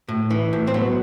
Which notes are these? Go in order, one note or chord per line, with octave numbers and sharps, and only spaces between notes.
A2
E3
A2
C4
F#3 B3